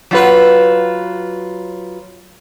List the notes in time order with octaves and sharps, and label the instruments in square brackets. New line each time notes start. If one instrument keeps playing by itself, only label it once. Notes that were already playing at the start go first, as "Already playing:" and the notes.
[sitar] F#3 F4 B4